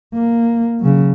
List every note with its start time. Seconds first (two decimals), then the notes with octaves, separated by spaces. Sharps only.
0.14 A#3
0.80 C#3 F#3